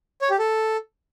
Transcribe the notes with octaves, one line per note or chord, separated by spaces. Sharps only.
C#5
G4
A4